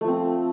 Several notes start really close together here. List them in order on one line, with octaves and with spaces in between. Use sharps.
A3 F3 C4